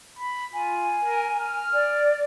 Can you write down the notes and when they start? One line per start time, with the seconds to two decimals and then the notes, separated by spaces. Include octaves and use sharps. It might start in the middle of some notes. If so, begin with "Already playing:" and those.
0.19 B5
0.54 F4 G#5
1.04 A#4
1.40 F6
1.74 D5